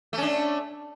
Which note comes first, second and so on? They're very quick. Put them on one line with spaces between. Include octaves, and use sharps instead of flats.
A3 C#4 D4